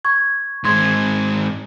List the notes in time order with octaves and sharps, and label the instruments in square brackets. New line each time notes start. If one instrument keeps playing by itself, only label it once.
[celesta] C#6 G#6
[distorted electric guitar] G#2 C4 [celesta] C6 D#6 G#6